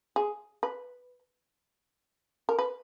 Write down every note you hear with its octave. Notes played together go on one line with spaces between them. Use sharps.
G#4
B4
A#4
B4